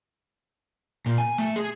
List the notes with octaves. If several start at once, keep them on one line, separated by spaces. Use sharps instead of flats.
A#2
G#5
A3
G#4